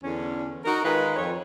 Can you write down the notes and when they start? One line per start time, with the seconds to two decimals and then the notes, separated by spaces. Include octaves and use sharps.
0.04 E2 D3 C#4
0.65 D#4 F#4 A#4
0.84 D#3 G#3 F4 B4
1.16 F2 C#5